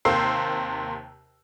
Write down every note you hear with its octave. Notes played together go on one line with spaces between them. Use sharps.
D#2 C3 A#3 C5 E6 C7